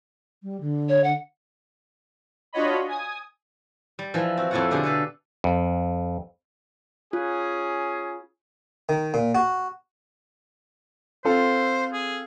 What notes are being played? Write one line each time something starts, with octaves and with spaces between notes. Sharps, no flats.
G3
D3
C#5
F#5
D4 F4 F#4 C#5 D#5 B5
G#5 D#6
G3
E3 F3
C4 F#4
F2 F3 E4 F4 C#5 F#5
B2 D3 G4 G#4
A4 B4 F5
F2
C#4 F4 G#4
D#3
A#2
F#4
C4 F4 A4 C5
G#4